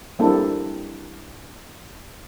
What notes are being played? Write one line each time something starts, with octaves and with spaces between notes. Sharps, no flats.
G3 A#3 C4 D4 E4 A4